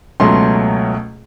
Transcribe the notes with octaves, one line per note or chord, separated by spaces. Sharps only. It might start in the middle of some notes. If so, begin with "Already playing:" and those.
C#2 B2 F#3 A3 C6